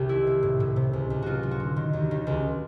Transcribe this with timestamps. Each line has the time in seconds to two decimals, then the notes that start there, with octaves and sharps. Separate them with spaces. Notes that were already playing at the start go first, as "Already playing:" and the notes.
Already playing: C2 C3 G4
0.09 D#3 E4
0.27 A#3
0.43 A2
0.60 A2
0.76 C3
0.93 C#2
1.10 C#2
1.22 F#3 F4 F#4
1.43 F#3
1.51 F#4
1.60 D3
1.76 D#3
1.93 D#2
2.11 D#3
2.27 C#2